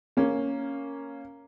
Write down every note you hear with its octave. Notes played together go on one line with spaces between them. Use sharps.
A#3 C#4